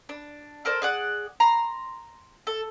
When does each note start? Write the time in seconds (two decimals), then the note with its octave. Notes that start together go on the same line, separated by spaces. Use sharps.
0.09 D4
0.65 A4 A#4 C5 D5
0.82 G#4 D5 F#5
1.40 A#5 C6
2.47 A4